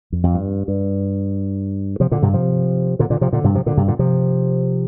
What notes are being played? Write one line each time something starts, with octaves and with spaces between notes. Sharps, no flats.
F2
F2
G2
G2
C3 F3
A#2 D3
G2 C3
C3 F3
A#2 D3
A#2 D3
C3 F3
A#2 D3
G2 C3
C3 F3
A#2 D3
G2 C3
A#2 D3
C3 F3